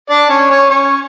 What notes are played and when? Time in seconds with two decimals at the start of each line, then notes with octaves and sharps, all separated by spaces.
0.10 D4 D5
0.30 C#4 C#5
0.50 C#4 C#5
0.70 C#4 C#5